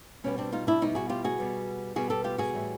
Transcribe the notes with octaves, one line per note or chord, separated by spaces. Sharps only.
B2 G3 B3 C#4
C4 D4
D#4 F4
D4 E4
B2 G3 B3 C#4 D#4
F#4 G#4
F4 G4
F#4 G#4
B2 G3 B3
B2 G3 B3 F#4 G#4
G4 A4
F4 G4
F#4 G#4
A2 E3 G3